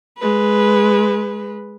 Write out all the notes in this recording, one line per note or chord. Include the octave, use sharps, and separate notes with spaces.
G#3 B4